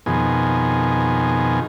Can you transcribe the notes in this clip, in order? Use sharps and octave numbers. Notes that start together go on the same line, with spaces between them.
F2 B2 D#3 G#4